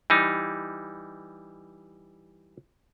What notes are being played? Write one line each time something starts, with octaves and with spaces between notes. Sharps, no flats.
E3 G3 D#4